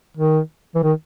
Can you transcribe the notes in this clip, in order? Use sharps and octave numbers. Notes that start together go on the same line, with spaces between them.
D#3
E3
D#3